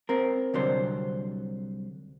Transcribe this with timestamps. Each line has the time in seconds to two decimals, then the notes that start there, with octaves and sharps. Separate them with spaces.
0.09 C4 A#4
0.54 C2 D3 F#3 C5